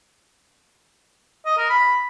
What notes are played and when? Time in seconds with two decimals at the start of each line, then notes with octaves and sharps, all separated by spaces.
1.46 D#5
1.58 A#4
1.69 B5